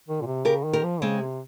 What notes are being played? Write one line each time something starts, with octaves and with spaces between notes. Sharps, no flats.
D#3
A#2
C3
C#3 G4 A#4
D#3
G4 A#4
F3
C#3 G#3 C4
C3